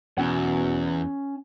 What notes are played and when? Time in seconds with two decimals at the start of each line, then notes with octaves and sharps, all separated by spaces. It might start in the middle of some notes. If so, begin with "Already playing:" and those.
0.18 E2 B2 C#4 F#5